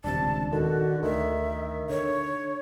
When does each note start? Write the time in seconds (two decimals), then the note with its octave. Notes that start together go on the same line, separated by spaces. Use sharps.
0.04 D#1 C#2 C3 D4 A5
0.53 D3 D#3 F#4
1.03 D2 D#3 E5
1.89 D3 C#5